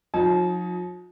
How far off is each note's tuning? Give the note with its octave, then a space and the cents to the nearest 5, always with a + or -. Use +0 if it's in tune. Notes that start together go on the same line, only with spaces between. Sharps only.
F3 +45 D#4 +10 A5 -40